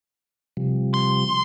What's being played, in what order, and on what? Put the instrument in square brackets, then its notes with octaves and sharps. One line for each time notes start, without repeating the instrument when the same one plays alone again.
[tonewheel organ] C3 F3 G3
[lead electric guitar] C6